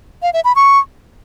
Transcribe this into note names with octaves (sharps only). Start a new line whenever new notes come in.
F5
E5
B5
C#6